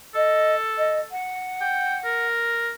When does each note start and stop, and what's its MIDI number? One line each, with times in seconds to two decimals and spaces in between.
0.15 1.12 69
0.15 0.55 75
0.77 0.99 75
1.11 2.27 78
1.61 1.97 79
2.05 2.71 70